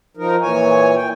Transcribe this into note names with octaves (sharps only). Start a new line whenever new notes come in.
F3 D#4 A#4
A#2 E3 C#5 G#5
G5